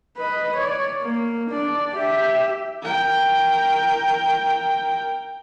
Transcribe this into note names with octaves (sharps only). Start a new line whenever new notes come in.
B4 D#5
C#5 D5
A#3
D4 D5
G4 E5
A#4 G5